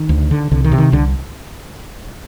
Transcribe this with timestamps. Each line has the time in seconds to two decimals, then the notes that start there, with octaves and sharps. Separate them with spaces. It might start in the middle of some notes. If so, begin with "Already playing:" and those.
Already playing: D#3
0.09 D2
0.31 D3
0.51 C2 D3
0.64 D#3
0.72 C3
0.78 D#3
0.92 C2 D3